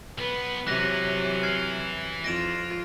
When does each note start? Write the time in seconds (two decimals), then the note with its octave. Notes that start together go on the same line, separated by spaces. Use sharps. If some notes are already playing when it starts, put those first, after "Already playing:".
0.18 B1 B3 B4
0.67 C3 E3 F#3 F#6 A#6 D#7
1.43 F6 G#6 C7
2.24 F2 F4 A#6 D7 E7